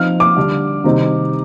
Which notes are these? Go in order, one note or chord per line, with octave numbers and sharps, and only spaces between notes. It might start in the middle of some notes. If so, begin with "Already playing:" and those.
Already playing: F3 C4 D#4 F6
D6
D3 G3 D4
C3 D#3 G3 C4 D#4